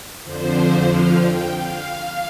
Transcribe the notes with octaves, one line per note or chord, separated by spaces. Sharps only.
F2 D3 F3 C5
F5
G5
F5